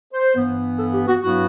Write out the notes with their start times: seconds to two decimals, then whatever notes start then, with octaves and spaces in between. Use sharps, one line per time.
0.13 C5
0.35 G2 E3 B3
0.78 A4
0.93 G4
1.07 F#4
1.21 G2 F#3 B3 E4 F#4